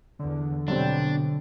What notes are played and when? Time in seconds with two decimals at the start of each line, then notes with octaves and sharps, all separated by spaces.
0.19 E2 D3
0.68 B2 F#3 G3 C4 D4